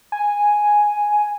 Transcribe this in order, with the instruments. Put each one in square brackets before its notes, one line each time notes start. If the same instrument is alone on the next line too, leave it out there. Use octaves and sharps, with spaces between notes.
[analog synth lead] G#5